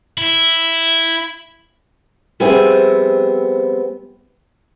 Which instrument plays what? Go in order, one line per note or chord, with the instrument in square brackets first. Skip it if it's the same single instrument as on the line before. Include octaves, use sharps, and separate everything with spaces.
[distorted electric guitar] E4
[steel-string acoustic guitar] F3 G3 B3 C4 G#4 E5